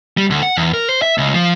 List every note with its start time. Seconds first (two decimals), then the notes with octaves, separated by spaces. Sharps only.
0.17 G3
0.30 D2
0.43 F#5
0.57 E2
0.74 A#4
0.89 C5
1.02 E5
1.18 C#2
1.34 F3